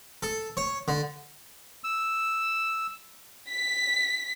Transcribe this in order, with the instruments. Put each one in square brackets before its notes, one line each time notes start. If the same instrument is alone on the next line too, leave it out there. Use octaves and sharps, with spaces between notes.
[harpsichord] A4
C#5
D3
[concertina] E6
[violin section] B6